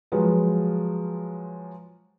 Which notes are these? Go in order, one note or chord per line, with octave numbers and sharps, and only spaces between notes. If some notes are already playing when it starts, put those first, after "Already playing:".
F3 F#3 G#3 F4 B4